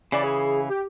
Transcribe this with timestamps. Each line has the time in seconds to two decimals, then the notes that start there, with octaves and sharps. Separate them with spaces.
0.12 C#3 E3 D5
0.24 G#4
0.69 G4